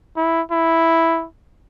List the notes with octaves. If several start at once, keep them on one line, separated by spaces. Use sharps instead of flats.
E4
E4